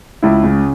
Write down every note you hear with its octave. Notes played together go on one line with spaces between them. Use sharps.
C#2 E4
C#3